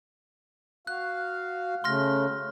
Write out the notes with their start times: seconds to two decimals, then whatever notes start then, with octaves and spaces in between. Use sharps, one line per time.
0.87 F#4 F5 F#6
1.84 C#3 A3 C6 F6 A#6